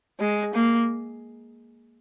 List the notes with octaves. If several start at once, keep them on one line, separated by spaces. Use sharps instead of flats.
G#3
A#3